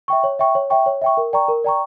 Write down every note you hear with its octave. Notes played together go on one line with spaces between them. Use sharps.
E5 G5 C#6
C#5
E5 G5 C#6
C#5
E5 G5 C#6
C#5
E5 G5 C#6
A#4
D5 G5 A#5 C#6
A#4
D5 G5 A#5 C#6